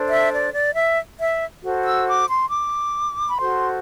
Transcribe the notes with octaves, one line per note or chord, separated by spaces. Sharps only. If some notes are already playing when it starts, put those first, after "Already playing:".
Already playing: D4 A4 C5
E5
D5
D5
E5
E5
F#4 A4 C5
E6
D6
C6
D6
B5
F#4 A4 C5 C6